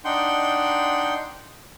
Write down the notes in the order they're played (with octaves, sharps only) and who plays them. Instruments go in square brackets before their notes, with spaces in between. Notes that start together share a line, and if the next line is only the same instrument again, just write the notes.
[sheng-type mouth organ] D4 D#4 F#5 G5 C6 G6